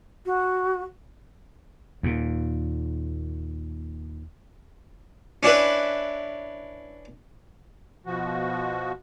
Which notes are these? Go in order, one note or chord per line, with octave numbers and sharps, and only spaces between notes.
F#4
D#2 A#2
C#4 D4 E4 B4
B2 F3 F#4